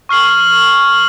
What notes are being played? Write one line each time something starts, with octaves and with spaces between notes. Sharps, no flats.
C#6 F6 C7 F#7